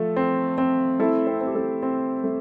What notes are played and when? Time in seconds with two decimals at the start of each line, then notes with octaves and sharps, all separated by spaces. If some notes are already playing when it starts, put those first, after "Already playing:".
Already playing: F3 A3 A4
0.16 C4
0.58 C4
1.00 A3 E4 A4
1.27 C4 C5
1.41 C4
1.47 G4
1.55 A3 A4
1.83 C4
2.24 A3